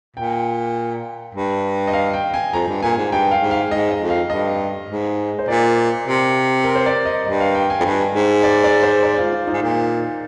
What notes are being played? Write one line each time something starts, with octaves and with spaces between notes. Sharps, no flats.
A#2 G5
G2
D#5
F5
G5
G#5
F2 A#5
G2
A#2 G#5
G#2
G2 G5
F5
G#2
F5
G#2 D#5
D#5
F2
F5
G2 D#5
G#2
C5
A#2 D5
C3
A#4
C5
D5
D#5
G2 D#5
F5
G5
G#5
F2
G2
G#2
D5
D5
C5
D5
F4
F4
D#4
G#2
A#2